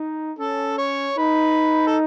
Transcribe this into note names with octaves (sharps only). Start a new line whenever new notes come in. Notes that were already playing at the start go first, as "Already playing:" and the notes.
Already playing: D#4
C#4 A4
C#5
D#4 B4
A4